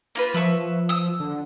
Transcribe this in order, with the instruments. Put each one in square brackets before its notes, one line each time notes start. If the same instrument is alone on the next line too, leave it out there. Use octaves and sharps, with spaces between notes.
[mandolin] A#3 F4 B4
[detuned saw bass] F3 [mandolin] B4 E5 C#6
[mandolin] D#6 E6
[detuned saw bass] D3